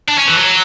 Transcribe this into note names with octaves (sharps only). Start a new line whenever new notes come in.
D4
C#4
E3
F#3